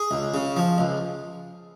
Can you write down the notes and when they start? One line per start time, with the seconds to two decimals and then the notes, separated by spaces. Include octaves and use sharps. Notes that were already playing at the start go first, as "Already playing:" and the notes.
Already playing: G#4
0.11 C#2
0.34 C#3
0.56 F3
0.78 C#2